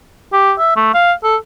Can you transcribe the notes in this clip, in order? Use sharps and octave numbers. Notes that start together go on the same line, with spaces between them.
G4
E5
A3
F5
A4